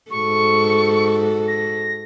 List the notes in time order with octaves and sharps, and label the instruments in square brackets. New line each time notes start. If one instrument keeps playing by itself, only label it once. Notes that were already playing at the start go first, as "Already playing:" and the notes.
[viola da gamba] G#2 F#4 A4 [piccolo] C#6
[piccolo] A#6